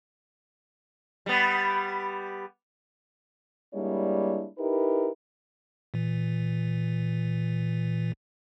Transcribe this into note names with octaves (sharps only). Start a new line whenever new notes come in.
G3 B3
G3 G#3 A#3 D4 E4 C#5
D#4 E4 G4 A#4 B4
A#2 E3